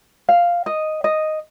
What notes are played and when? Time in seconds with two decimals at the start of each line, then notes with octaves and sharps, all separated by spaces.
0.29 F5
0.66 D#5
1.04 D#5